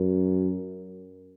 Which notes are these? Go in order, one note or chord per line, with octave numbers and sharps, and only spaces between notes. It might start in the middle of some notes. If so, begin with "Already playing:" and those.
Already playing: F#2